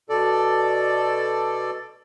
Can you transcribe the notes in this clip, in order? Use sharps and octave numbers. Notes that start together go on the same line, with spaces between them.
B2 A4 D5